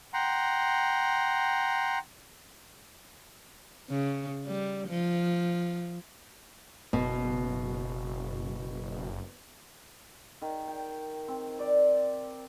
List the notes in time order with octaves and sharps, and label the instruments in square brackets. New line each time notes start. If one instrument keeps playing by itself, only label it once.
[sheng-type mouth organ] F#5 G5 A#5 C6
[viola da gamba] C#3
G3
F3
[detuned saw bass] F#1 [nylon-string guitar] B2
[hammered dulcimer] D#3
G5
C4
D5